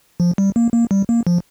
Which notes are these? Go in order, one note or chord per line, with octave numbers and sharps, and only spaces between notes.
F3
G3
A#3
A#3
G3
A#3
F3